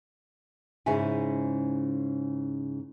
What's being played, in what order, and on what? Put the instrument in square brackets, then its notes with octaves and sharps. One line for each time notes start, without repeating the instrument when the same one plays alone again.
[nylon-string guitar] G#2 C#3 C#4 E4 G#5